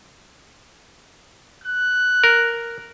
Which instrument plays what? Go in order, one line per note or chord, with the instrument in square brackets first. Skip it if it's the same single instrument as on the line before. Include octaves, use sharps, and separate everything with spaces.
[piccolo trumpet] F#6
[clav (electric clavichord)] A#4